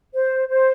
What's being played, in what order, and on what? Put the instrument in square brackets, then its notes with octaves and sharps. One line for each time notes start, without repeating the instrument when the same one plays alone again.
[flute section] C5
C5